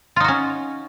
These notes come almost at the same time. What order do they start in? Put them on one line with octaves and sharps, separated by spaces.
F4 D#4 F#4 C#4